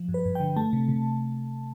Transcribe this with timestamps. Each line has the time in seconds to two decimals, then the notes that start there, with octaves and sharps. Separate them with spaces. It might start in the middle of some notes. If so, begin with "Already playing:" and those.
Already playing: F3
0.09 G2
0.14 B4
0.25 G2
0.35 G5
0.40 D3
0.56 A3 A5
0.73 C3
0.88 C3